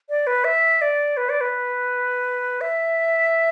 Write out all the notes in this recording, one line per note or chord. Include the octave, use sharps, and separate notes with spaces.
D5
B4
E5
D5
B4
D5
B4
E5